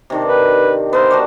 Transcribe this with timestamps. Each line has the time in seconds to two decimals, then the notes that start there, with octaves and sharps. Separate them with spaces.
0.10 C3 D#3 D4
0.25 B4
0.93 B3 A#4 C5 E5
1.11 G3 D4 F#4